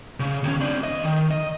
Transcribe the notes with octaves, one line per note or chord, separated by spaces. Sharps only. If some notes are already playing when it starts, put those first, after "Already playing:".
C#3
D#2 C#4
C4 D4
D#2 D#5
D#3
D#5